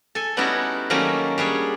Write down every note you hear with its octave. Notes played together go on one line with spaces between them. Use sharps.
A4 G#5
G3 B3 C#4 D#4 E4 F#4
D#3 F#3 G3 A3 A#3 C#4
G3 D4 G#4 C#5